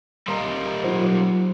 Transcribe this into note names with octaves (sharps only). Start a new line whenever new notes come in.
C2 G3 A#3 D#5 A#5 C6
F#3 D#4 F4 C5